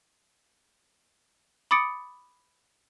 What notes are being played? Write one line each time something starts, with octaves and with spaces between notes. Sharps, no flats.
B5 D6 D#6 A6 C#7 D7